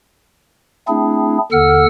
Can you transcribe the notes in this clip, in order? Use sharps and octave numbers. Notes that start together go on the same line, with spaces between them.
A3 C4 D4 E4 G#4
D#2 D3 A4 F#5 E6 F6